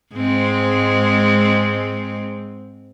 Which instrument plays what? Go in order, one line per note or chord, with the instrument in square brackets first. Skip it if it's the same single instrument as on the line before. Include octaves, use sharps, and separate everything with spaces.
[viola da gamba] G#2 G#3 C4